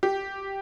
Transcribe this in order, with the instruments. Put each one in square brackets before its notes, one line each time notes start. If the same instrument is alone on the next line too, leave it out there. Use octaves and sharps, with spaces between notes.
[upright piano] G4